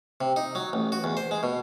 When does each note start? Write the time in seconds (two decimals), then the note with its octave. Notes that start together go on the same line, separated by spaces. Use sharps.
0.21 C3
0.36 D#4
0.55 F#3
0.73 A1
0.92 F#4
1.04 E2
1.17 C5
1.31 G#3
1.43 B2